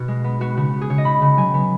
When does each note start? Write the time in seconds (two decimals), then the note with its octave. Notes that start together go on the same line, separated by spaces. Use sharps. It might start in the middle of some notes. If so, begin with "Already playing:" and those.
Already playing: B2 F#4
0.08 G#3
0.24 B3
0.41 B3 F#4
0.57 C#3 F#4
0.73 B3
0.81 G#4
0.90 C#3 C#5
0.98 D#5
1.05 C#3 B5
1.22 C#3
1.38 F#3 G#5
1.54 B3